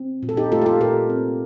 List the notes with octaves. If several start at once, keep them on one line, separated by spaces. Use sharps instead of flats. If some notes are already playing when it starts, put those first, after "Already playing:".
Already playing: C4
A#2
A4
D#4 G4
A3 F4 A4
G4
F4 A4
A#2 G4 A#4
C4